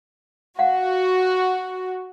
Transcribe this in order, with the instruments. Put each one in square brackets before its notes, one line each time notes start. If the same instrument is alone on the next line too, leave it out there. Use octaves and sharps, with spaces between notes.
[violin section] F#4 [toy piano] F5 F#5